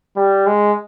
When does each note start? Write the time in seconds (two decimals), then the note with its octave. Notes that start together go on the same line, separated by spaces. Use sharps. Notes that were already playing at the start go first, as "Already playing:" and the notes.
0.17 G3
0.46 G#3